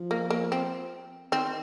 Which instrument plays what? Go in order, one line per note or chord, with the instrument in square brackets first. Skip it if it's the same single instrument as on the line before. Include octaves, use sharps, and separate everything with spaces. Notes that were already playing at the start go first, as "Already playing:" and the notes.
Already playing: [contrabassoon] F3
[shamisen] A#3
A#3
C4
[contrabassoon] D#3 [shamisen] C4